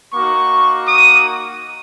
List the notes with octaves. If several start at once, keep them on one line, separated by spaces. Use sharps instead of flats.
A#3 D#4 F#4 C#6
D#6